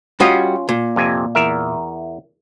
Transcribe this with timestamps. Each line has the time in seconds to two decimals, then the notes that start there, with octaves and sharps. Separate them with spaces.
0.20 G3 C#4 F4 F#4 D#5
0.69 A#2
0.96 F2 C3 G#5
1.35 E2 A#4 E5